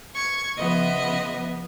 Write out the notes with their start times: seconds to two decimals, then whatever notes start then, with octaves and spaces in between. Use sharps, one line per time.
0.15 C#6 G#6
0.57 C#3 F3 B3 D#5 E5